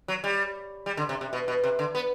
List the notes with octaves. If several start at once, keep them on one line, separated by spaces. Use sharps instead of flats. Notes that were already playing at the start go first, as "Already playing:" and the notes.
F#3
G3
G3
D3
C3
C3
B2
B2
C3
D3
B3